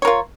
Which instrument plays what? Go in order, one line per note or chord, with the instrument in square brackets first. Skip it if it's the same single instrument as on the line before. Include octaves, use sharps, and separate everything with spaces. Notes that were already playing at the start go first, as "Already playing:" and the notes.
[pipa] C#5
A#4
F4